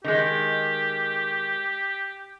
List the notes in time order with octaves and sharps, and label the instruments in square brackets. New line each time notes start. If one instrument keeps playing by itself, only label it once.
[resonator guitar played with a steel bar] D#3 G#3 [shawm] G4